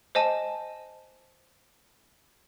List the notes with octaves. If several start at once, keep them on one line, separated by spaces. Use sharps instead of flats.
C5 D#5 G#5 A5